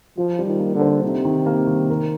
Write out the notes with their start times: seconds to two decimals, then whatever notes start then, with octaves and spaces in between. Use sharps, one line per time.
0.17 F3 F4
0.39 G3
0.46 D#3
0.59 A#3
0.75 D3
0.82 C5
1.04 C3 D#4
1.25 D#3
1.46 A#3
1.67 D#3
1.90 A#4